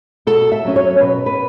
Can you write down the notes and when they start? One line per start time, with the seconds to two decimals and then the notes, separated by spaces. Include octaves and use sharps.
0.27 B2 A4
0.52 E5
0.65 F#3 C#4
0.76 C#5
1.00 B2 B4
1.26 B4